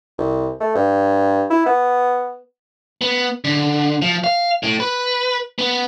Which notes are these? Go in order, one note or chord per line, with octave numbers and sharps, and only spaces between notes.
C2
A3
G2
E4
B3
B3
D3
F3
F5
A2
B4
B3